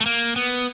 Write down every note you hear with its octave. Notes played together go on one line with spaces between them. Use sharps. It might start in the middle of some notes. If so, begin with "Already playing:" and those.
A3
A#3
B3